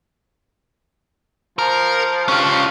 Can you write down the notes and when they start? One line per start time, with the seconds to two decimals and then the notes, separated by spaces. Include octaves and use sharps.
1.59 F3 A#4
2.29 G2 C#4 F4